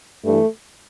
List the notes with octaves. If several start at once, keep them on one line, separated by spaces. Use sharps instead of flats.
G2 E3 A3